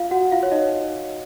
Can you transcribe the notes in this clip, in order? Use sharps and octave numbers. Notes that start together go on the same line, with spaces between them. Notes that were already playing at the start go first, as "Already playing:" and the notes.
Already playing: F4 F5
F#4 F#5
F4 F5
C#5
D#4 D#5